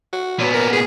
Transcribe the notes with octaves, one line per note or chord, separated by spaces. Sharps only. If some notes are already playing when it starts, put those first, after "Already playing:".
F#4
A#2 F#3 B3
A#4
G#4